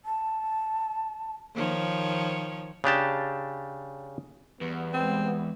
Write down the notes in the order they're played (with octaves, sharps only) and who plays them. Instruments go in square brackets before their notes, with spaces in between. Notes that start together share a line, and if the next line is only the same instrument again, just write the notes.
[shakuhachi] A5
[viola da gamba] D#3 F3 C#5
[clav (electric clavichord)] C#3 D4 G4 A5
[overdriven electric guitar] E2 [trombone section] G3 B3
[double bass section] G#3 [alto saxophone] C4